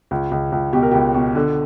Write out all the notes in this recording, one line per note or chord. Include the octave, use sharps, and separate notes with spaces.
C#2
C#2
C#2
B2 G4
A#4
C#2 G4
B2
D3